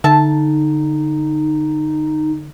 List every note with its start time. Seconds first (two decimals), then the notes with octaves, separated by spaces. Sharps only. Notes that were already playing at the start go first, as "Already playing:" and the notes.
0.04 D3 D#4 E5 A5